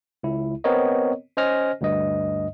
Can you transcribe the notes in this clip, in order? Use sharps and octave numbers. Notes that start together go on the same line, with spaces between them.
C#2 E4
B3 C4 A#4 C#5 D#5
C#4 C5 D#5 G#5 F6 A#6
D2 G2 D#5